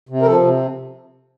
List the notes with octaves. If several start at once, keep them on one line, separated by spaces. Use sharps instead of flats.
C3
A#4
F3 A4
C3